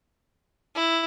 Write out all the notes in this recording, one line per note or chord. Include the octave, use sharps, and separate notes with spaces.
E4